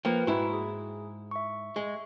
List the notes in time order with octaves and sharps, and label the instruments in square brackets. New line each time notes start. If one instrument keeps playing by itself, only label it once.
[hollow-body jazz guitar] F3 A#3 [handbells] B4 G5
[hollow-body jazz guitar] G#2 E4 [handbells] F#4 B5
[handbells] G#4
E5 C#6
[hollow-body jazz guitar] G#3